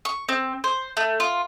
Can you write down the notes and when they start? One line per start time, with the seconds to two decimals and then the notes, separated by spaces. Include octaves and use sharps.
0.05 C#6
0.29 C4
0.64 C5
0.97 A3
1.20 F4